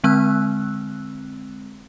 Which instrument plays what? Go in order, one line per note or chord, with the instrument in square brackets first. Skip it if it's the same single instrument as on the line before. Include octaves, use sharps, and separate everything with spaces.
[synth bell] D3 G#3 C4 E6 F#6